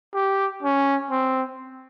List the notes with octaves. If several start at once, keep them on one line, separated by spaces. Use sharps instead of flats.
G4
C#4
C4